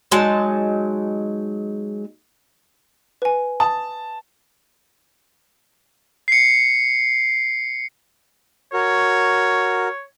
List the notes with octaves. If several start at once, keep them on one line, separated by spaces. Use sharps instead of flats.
F#3 G#3 D#4 A5
B4 G#5
A5 D#6
C7 C#7
F#4 A#4 C#5